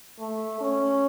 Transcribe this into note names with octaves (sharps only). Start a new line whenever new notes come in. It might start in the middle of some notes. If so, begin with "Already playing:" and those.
A3
C#4